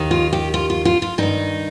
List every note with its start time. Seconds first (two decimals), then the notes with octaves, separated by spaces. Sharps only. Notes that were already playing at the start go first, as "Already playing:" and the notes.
Already playing: D#2 D#3
0.11 F4
0.33 G4
0.54 F4
0.70 F4
0.85 F4
1.02 F4
1.18 G2 D#3 D#4